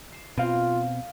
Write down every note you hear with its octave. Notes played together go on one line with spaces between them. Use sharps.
C7 E7
B2 C4 F4 F5 D7 D#7